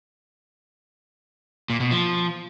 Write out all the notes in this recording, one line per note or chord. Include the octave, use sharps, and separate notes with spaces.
A#2
B2
F3